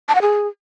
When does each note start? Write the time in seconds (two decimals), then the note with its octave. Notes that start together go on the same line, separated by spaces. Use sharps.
0.09 A5
0.15 F#5
0.22 G#4